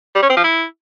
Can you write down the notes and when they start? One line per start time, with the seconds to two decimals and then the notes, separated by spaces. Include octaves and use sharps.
0.15 G3
0.22 C#4
0.30 C4
0.37 F3
0.44 E4